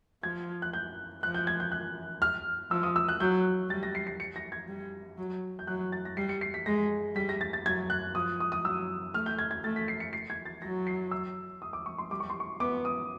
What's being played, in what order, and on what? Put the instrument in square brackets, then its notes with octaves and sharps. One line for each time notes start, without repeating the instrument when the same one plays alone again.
[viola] F3 [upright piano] G#6
[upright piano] F#6
G6
[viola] F3 [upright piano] F#6
[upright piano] G6
G#6
G6
F#6
F6
[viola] F3 [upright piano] E6
[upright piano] D#6
E6
F#6
[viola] F#3 [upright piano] G6
[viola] G3 [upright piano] A6
[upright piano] A#6
C7
C7
C#7
A#6
G#6
[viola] G3
F#3
[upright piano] G6
[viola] F#3 [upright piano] F#6
[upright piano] A6
A#6
[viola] G3 [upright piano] C7
[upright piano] C#7
C7
B6
[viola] G#3 [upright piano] A#6
[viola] G3 [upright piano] B6
[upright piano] A#6
A6
A6
[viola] F#3 [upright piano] G#6
[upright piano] F#6
[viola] F3 [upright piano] D#6
[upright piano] D#6
D#6
[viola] F#3 [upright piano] E6
[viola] A3 [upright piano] F6
[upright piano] G6
G#6
G#6
[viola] A3 [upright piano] A6
[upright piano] B6
C7
C#7
C7
G#6
A6
[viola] F#3 [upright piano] A#6
[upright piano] C7
E6
D#6
D6
C#6
C6
[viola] G3 [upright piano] D6
[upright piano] C#6
C6
C#6
[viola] B3 [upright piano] D6
[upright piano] D#6